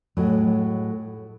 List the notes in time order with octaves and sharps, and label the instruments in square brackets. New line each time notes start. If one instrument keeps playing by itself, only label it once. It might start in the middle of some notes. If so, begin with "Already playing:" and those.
[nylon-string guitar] A2 F#3 G#3